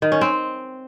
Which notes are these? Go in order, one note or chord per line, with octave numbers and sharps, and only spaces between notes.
D#3
C#4
C4